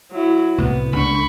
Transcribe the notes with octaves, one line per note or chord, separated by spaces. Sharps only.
F#3 E4
C2 A2 B3
C#2 D4 B5 C#6